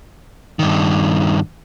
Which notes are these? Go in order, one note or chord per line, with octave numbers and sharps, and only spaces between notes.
G2 D#3